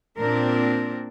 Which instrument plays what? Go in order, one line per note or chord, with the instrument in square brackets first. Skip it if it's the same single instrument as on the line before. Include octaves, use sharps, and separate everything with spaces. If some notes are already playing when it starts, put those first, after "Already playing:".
[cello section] A#2 C4 D4 A#4